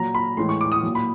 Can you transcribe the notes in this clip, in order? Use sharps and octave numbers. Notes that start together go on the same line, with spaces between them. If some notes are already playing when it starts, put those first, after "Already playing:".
Already playing: A#2 F#3 A#5
B5
A2 E3 G#3 C6
C#6
D6
D#6
A#2 F#3
B5